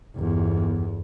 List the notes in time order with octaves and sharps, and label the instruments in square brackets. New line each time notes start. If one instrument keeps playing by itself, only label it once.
[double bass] G1 E2